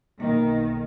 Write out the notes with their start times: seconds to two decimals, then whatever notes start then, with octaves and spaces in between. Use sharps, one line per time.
0.20 B1 D#3 A#3